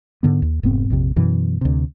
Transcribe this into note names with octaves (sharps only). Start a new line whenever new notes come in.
G#2 D3 B3
D#2
F1 G#2 B3 C4
A#1 F2 C3
F#2 B2 E3
D2 C3